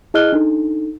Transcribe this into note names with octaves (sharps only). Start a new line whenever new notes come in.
E4 G#4 D#5 F6 F#6 G7
D4 D#4 A4